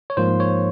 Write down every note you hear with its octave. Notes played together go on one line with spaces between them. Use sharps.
C#5
G#2 F3 A#3 C5
C#5